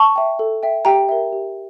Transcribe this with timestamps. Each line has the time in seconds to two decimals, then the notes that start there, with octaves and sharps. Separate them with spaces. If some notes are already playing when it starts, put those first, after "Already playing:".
Already playing: A5 C#6
0.16 E5 G5
0.39 A4
0.63 E5 G5
0.85 G4 G5 A#5
1.09 A#4 E5
1.33 G4